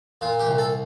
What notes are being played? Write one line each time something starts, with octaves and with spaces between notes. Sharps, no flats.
A#2 F4
G4
C2
A4